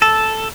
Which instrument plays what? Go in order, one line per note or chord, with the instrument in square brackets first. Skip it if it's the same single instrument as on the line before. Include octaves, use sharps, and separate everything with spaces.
[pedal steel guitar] A4